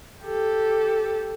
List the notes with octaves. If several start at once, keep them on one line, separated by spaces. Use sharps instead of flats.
G4 A4